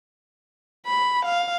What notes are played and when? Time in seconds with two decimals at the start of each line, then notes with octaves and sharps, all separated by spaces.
0.87 B5
1.25 F5